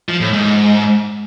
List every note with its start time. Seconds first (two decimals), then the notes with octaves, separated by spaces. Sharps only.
0.09 F3
0.21 A2
0.33 G#2